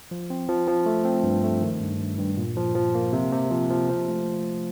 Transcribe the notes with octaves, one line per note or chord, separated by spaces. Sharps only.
F3
C4
F3
F3
A3
C4
G2
A3
D#3
G2
G2
G2
A#2
F3
F3
A#3
C3
C3
F3
F3
F3
A3